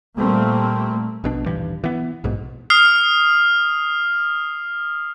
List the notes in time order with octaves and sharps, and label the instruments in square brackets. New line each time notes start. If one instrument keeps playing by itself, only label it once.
[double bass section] A#2 G3 A3 A#3 C4
[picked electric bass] A#1 B2 D4
D#1 G2 E3 G3
E3 B3
A#1 G#2 B2
[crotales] D#6 F6 C7